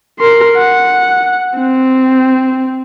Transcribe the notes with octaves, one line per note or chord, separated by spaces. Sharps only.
A#4 C6
F#5
C4